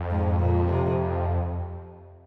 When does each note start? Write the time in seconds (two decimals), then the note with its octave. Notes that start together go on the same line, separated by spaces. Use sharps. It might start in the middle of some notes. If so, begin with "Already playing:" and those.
Already playing: F2
0.11 G#2
0.40 A#2
0.69 C3